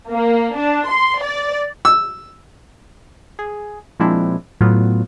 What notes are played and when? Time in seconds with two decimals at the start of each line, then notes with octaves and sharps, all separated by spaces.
0.11 A#3
0.57 D4
0.89 C6
1.23 D5
1.85 E6
3.39 G#4
4.00 A#2 F3 G#3 C4 D4 E4
4.61 A2 F#3 B3 F4